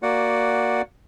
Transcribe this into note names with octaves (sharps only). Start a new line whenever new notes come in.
A#3 F#4 D5 F#5